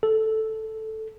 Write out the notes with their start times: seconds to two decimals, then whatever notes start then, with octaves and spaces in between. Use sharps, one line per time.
0.03 A4